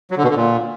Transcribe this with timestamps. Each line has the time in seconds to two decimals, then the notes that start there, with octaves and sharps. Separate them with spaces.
0.11 F#3
0.17 D3
0.23 B2
0.30 D3
0.36 A#2